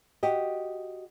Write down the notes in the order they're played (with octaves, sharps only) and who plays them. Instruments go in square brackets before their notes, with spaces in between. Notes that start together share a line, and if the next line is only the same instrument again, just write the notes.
[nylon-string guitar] F#4 G4 D#5